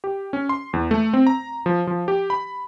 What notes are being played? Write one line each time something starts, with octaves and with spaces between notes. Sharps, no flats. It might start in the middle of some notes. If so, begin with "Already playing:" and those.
G4
C#4
C6
E2
A3
C4
A#5
F3
F3
G4
B5